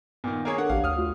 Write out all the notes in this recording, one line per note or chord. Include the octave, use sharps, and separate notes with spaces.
A#2 D#3 B3
A#3 G#4 C#5
D4 A4 A#4 F#5
A1 D4 G4 F5
D2 C#5 D#6 F6
A3 F4 F#4